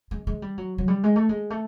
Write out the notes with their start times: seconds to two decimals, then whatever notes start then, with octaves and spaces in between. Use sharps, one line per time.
0.11 G#3
0.27 G#3
0.42 G3
0.58 F#3
0.78 F#3
0.88 G3
1.03 G#3
1.16 A3
1.29 G#3
1.50 A3